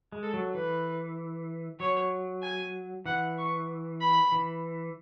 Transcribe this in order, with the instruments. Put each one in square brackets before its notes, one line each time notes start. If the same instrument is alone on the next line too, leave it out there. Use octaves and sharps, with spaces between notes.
[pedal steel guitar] G#3
[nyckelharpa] A4
[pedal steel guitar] F#3
[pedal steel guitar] E3 [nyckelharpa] B4
[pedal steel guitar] F#3 [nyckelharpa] C#5
[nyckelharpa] G#5
[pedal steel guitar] E3 [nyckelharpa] F#5
[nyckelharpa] C#6
B5
[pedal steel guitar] E3